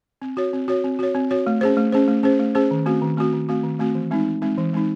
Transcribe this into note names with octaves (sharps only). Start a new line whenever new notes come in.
C4
F#4 C#5
C4
F#4 C#5
C4
F#4 C#5
C4
F#4 C#5
A3
C#4 G#4 C5
A3
C#4 G#4 C5
A3
C#4 G#4 C5
A3
C#4 G#4 C5
D#3
A3 C4 F#4
D#3
A3 C4 F#4
D#3
A3 C4 F#4
D#3
A3 C4 F#4
E3
G#3 C4 D#4
E3
G#3 C4 D#4
E3
G#3 C4 D#4